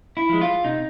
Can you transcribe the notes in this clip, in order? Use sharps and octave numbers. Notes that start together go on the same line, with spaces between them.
E4
F3 G#3
F4
C3 D#4